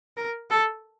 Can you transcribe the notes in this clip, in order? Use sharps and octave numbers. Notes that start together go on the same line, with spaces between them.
A#4
A4